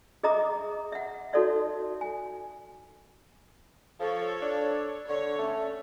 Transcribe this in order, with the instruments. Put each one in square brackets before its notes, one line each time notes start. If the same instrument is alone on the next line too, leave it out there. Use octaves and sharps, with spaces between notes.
[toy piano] G#4 D#5 E5 A#5 D6 D#6
E5 F#5
D#4 F#4 A4 C#5 D5 E5
G#5
[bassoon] F3 [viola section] A4 C#5
[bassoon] D4
[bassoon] D3 [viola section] C#5
[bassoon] A3 [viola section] C#4